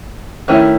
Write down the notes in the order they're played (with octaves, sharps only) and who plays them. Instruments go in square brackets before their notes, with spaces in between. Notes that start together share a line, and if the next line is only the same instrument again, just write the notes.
[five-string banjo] D#3 A3 C#4 E4